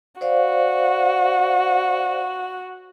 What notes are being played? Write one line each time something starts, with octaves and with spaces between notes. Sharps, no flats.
F#4 C5 D5 F5